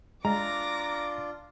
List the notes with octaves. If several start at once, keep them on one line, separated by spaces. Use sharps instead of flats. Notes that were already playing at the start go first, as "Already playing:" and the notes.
G#3 D4 F4 A#5 D6 A#6